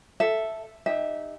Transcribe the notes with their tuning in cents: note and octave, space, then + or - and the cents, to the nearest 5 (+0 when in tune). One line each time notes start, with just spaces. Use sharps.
A4 +0 E5 +0
D#4 -25 G4 +30 E5 -15